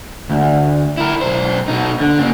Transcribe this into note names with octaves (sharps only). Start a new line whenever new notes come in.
D2
E4 A#4
B1 C5
B2 D#4
D3
C#3 A#3